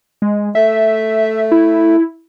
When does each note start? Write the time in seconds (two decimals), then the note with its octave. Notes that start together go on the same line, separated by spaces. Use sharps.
0.22 G#3
0.55 A3 E5
1.51 E4